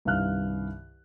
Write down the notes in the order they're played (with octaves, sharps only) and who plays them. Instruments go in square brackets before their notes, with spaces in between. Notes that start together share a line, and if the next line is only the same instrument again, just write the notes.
[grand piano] C2 G2 D#3 F5 F6 F#6